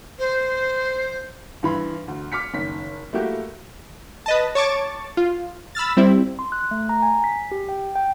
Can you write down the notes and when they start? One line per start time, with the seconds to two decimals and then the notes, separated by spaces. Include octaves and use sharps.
0.19 C5
1.63 G2 E3 B5 C6
2.08 D2
2.32 D6 F6 B6 C#7
2.53 F#1 D#3 B6
3.13 A3 A#3 E4 F#4 G4
4.26 B4 D#5 A5
4.55 C#5 A5 C#6 D6 A6
5.17 F4
5.75 B5 E6 F6 A6
5.97 G3 C4 E4
6.39 C6
6.52 F#6
6.71 A3
6.89 A#5
7.02 G#5
7.24 B6
7.52 G4
7.69 G5
7.95 G5